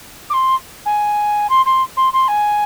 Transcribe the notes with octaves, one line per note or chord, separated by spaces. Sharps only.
D6
C6
G#5
C6
C6
C6
C6
G#5